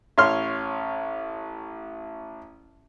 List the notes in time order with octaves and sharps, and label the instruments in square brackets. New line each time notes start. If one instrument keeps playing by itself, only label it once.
[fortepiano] A1 C#5 C6 F6